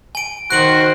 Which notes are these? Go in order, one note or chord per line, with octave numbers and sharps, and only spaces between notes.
G#5 D7
D#3 F#4 C5 F#6 D7 F#7